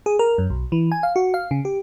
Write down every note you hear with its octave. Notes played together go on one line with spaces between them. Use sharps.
G#4
A#4
F#2
B1
E3
G#5
F5
F#4
F5
C#3
G4